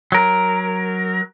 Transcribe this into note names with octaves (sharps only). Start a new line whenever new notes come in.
F#3 A#4